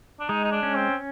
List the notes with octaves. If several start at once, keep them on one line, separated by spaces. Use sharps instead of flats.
D4
G#3 D#4
D#4
D4
C#4
C4